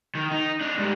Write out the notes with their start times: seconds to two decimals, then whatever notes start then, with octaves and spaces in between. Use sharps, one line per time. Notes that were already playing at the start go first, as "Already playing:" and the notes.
0.15 D#3
0.32 D#4
0.61 D4 D#4
0.78 G#2 G3